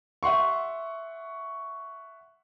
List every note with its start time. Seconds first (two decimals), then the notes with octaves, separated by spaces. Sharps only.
0.23 E5 F#5 C6 C#6